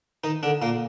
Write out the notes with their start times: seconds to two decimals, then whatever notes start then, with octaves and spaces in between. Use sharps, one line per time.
0.24 D#3 D#4
0.43 D3 D4
0.62 A#2 A#3